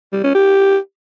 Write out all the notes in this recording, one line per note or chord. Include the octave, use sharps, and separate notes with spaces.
G3
C#4
G4